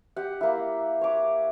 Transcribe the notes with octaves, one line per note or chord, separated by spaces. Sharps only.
G4 F#5
A#3 E4
C#5 D6